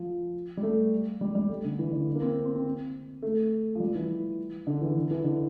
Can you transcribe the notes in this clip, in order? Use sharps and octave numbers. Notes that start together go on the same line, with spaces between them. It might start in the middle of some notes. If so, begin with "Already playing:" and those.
Already playing: F3
G3
A3
G3
G3
A3
D3
E3
D3
A#3
C4
C4
C4
A3
F3
G3
E3
D3
E3
E3
E3
D3